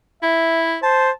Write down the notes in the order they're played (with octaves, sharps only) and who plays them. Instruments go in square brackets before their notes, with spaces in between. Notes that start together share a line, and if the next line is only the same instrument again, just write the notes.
[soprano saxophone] E4 [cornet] E5
[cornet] C5 [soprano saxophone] A5